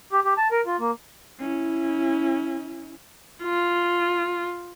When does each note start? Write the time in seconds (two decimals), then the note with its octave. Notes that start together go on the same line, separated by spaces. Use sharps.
0.12 G4
0.24 G4
0.38 A5
0.51 A#4
0.66 F4
0.80 A#3
1.39 C#4 E4
3.43 F4